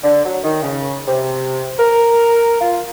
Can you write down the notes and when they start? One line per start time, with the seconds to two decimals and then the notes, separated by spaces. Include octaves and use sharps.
0.03 D3
0.25 F#3
0.43 D#3
0.63 C#3
1.08 C3
1.79 A#4
2.61 F4